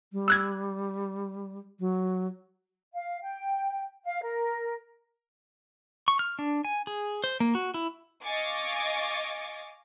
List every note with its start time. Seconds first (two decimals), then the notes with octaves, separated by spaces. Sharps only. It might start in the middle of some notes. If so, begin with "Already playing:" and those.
0.13 G3
0.28 E6 F#6 G#6
1.80 F#3
2.93 F5
3.23 G5
4.05 F5
4.23 A#4
6.08 C#6
6.19 F6
6.39 D4
6.65 G#5
6.87 G#4
7.24 C5
7.40 A#3
7.55 F#4
7.74 E4
8.23 D#5 F5 G#5 C#6 D6 A6